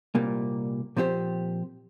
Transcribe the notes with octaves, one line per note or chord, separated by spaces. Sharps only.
C2 A#2 G3 A#3
A#2 F3 C4 G4 C5